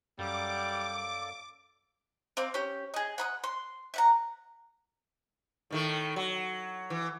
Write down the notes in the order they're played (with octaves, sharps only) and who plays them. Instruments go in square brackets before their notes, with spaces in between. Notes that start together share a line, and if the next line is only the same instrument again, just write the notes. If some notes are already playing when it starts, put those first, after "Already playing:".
[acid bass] F#2 [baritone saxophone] G3 [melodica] A#3 A4 D5 [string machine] D6
[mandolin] C4 F5 D6
C#4 G4
G#4 D#5
F#5 B5 D#6
C6
E5 F#5 A#5
[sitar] A2 D#3 A3
F#3
E3